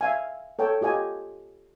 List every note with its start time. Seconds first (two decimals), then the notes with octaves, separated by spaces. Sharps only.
0.01 E5 F5 G#5
0.59 A4 C#5 G5 A5
0.81 F4 G4 D#5 G#5